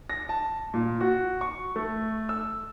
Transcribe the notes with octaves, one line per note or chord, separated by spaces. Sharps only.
A#6
A5
A#2
F#4
C#6
A3
E6